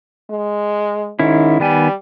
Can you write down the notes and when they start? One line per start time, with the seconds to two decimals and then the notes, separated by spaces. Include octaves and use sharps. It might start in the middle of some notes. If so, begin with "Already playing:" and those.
0.30 G#3
1.19 G#2 D#3 C#4 E4
1.60 D#3 G3 B3 G#5